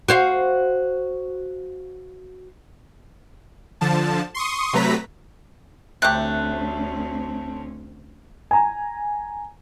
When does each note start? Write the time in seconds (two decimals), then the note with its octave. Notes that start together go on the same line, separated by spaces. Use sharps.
0.08 F#4 C5 F5
3.81 D3 F3 A5
4.35 C6 C#6 D#6
4.73 C3 F#3 A3 B4 A#5 B6
6.02 D2 C3 A3 C4 C#4 G4 F#6
8.51 G#5 A#5